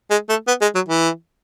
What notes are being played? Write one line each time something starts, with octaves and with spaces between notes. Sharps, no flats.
G#3
A3
B3
G#3
F#3
E3